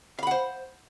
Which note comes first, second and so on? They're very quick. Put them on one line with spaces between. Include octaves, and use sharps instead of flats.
F5 B5 F#5 C5